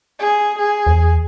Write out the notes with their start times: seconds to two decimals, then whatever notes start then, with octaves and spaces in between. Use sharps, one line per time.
0.19 G#4
0.58 G#4
0.87 E2